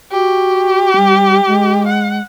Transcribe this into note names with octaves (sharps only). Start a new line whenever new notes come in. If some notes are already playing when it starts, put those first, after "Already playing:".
F#4 G4
G3
G#3
F#5